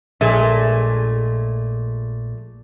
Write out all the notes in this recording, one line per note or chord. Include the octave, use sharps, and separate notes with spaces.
A#1 A#2 G#3 A3